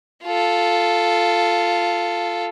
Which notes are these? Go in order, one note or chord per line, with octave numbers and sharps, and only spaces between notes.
F4 A4